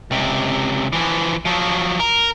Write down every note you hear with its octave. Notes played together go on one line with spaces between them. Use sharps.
C#2 C3
E3 F3
F3 F#3
A#4